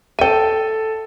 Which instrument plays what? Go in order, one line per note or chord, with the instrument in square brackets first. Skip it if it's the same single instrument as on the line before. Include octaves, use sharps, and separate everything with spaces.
[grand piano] A4 D#7 [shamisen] E5 G5